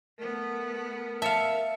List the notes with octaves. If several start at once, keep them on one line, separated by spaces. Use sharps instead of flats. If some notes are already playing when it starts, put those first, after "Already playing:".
A3 B3 A#4
E5 F5 A5 C#7